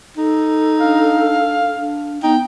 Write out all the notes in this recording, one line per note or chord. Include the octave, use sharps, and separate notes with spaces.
D#4 A4
D4 F5
D4
B3 D#4 G5